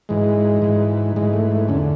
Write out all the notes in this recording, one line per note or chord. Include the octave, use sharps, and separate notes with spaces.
G#2 E3 G#3
G#2 E3
G#2 E3 G#3
A3
A3
E2 D3 C#4